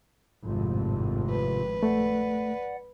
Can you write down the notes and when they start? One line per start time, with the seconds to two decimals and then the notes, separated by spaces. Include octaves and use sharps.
0.46 G#1 F2 A2 C3 F4
1.30 B4
1.83 A3 D5 F#5